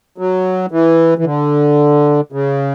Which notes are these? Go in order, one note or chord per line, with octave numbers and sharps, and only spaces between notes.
F#3
E3
E3
D3
C#3